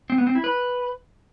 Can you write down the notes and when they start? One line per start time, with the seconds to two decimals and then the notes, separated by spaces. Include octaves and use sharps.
0.10 C4
0.18 B3
0.27 C4
0.35 E4
0.44 B4